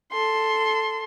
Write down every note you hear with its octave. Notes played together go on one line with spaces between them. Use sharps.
A4 C6